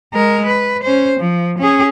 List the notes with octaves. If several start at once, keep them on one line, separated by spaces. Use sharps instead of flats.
G#3 A#4
B4
C#4 C5
F3
C#4 G#4